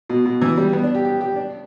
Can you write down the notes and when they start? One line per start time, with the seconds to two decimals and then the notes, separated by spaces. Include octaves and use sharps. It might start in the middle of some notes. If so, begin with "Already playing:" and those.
0.09 B2
0.26 B2
0.42 E3
0.57 G3
0.73 B3
0.83 D4
0.95 G4
1.05 G4
1.21 G4
1.36 D4